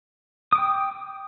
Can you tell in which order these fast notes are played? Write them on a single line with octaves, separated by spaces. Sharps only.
D#6 D6 G5